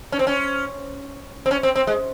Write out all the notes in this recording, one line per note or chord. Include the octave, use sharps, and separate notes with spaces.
C#4
C4
C#4
C4
C#4
C4
C4
G#3